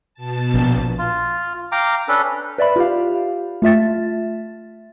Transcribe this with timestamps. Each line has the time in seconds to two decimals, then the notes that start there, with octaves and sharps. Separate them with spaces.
0.14 B2 A5
0.54 A#1
0.98 F4
1.72 F5 G5 A#5 D6
2.08 C#4 D4 A4 B4
2.58 B4 D5 E5 B5
2.76 F4 G4 F5
3.62 A3 F4 E5 A6